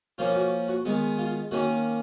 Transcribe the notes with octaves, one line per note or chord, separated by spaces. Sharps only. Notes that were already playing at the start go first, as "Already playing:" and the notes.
F3 A#3 C#4 F4
F#4
F#4
D#3 G#3 B3
F4
D#3 A#3 C#4 F#4